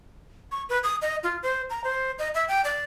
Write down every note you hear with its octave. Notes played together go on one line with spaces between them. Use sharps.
C#6
B4
D#6
D#5
F4
C5
A#5
C5
D#5
E5
G5
D5